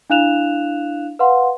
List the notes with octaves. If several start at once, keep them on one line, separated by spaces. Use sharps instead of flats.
D4 E4 F5 F#6 E7 F7
B4 F5 F#5 C6